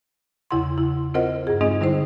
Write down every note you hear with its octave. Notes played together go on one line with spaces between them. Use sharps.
E2 C#3 E4 F#5 C6
E4
C4 F4 A#4 C5 D#5 F#5
G2 G#4
G#3 C4 D#4 G#4 D#5
D3 G3 D#4 E4 C5